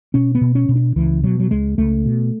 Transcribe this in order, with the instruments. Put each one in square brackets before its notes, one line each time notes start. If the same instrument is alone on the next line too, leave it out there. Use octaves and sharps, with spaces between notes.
[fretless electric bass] B2 C#4
B3
B2
C#4
B2
D4
C#2 E3
B2 F#3
F#3
C#2 G#3
C#2 A3
B2